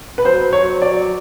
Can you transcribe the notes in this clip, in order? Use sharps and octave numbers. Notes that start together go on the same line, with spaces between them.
B4
F#3 C5
F#3 C#5
F#3 D5